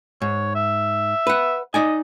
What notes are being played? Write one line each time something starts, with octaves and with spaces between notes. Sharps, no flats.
G#2 C#5
E5
B4 F#5
D#4 D5 D#5 G#5